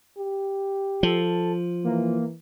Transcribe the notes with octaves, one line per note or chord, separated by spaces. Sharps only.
G4
F3 A4
E3 A#3